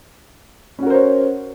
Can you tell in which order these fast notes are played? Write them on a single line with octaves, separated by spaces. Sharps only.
C#4 F#4 A#4 C5 C#5